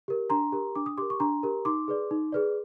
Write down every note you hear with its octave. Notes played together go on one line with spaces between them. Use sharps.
G4 A#4
D4 A#5 C6
G4 A#4
D4 D6
D#6
G4 A#4 C6 D6
C#6
D4 A#5 C6
G4 A#4
D#4 C6 D6
G#4 B4 D5
D#4
G#4 B4 D5